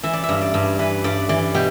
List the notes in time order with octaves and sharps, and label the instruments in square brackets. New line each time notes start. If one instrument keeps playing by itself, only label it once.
[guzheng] E3 E5
D5
E5
G2
D5
G2
E3 B4
G2 D5
E3 D5
B2 G4